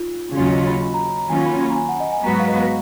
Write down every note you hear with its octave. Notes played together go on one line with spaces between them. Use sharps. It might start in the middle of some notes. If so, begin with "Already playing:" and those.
Already playing: D#4 F4
D#2 C#3 F#3 C#4 F4 F#4
D#5
C#5
B5
B5
A#5
A#5
A#5
D#3 F#3 A#3 C#4 F4 G#5
B5
B5
A#5
G#5
F#5
D#5
G#5
G#2 F#3 B3 F#4 B4 A#5
F5
D#5
F5